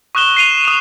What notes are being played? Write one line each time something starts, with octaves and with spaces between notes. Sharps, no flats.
C#6 D#6 F#6 E7 G7
C7 D#7 F7
D#6 D#7